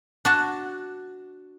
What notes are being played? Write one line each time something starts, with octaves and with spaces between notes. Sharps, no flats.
D4 F#4 A5